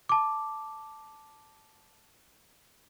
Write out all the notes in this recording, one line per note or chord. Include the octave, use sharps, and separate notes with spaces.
A5 D6